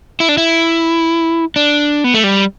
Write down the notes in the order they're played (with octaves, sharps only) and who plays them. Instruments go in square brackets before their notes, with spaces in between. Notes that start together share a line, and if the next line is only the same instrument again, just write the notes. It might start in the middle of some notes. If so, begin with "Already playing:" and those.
[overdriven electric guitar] E4
D4
E4
D4
B3
A3
G3